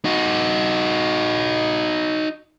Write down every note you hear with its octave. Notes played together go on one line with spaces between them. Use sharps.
D#4 F#4